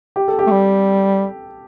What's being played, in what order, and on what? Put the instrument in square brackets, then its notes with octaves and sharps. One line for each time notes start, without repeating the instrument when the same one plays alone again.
[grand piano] G4
A4
G4
[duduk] A3
G3